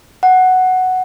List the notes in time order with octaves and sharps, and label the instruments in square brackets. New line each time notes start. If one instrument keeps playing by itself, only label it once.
[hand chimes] F#5